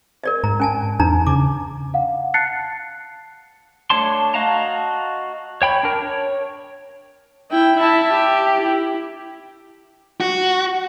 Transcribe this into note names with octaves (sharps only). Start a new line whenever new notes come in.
A#4 D5 D#5
G#2 A#5
C#4 G#5 A5
E2 D4 D#4 A#5
C#3 D6
F5 F#5
A5 F#6 A6 C7 C#7
A3 D4 C#5 A5 C6
F#4 D#5 F5 A5 A#5
C#5 G5 B5
D4 A#4
C#5
E4 G5
E4 E5 A5
G4
E4
F#4